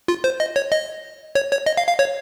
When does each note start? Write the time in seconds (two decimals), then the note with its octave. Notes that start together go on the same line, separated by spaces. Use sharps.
0.08 F4
0.24 C5
0.40 D#5
0.56 C#5
0.72 D#5
1.35 C#5
1.52 C#5
1.66 D#5
1.77 F5
1.88 F5
1.99 C#5